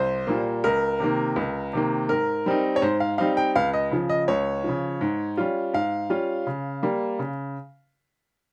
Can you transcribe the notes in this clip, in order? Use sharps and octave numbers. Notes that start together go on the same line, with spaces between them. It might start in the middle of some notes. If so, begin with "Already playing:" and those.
Already playing: C2 C5
A#2 G3 A#3
C#2 A#4
C3 D#3 A#3
C#2
C3 D#3 A#3
G#2 A#4
G3 C4 D#4
C#5
G#2 C5
F5
G3 C4 D#4 F5
G5
C#2 F5
D#5
C#3 F3
D#5
C#2 C#5
C#3 F3
G#2
G3 C#4 F4
G#2 F5
G3 C#4 F4
C#3
G3 A#3
C#3